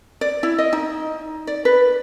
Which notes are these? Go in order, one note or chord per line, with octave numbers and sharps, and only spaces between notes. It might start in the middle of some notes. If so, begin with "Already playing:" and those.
D5
E4
D#5
D#4
D5
B4